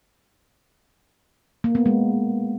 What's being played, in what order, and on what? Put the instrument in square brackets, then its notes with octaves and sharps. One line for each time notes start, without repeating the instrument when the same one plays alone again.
[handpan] A#3
B3
G#3